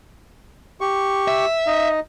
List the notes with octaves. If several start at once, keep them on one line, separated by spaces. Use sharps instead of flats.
G4 C#6
E5
D#4 D#5